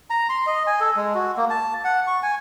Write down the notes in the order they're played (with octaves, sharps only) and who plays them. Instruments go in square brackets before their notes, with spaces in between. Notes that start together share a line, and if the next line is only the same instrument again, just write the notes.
[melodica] A#5
C6
D#5
G#5
A4
G#3
F#4
A#3
A5
F#5
C#6
G#5